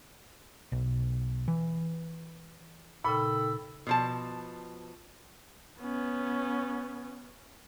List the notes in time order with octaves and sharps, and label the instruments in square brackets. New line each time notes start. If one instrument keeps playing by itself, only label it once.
[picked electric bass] B1
E3
[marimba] A#2 C#3 [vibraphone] D#4 A4 G5 [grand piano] B5 [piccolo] E6
[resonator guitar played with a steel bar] B2 F3 A5
[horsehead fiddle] B3 C#4